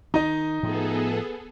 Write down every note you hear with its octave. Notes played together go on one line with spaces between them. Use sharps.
D#3 D#4 D#5
A2 F3 B3 G#4 A4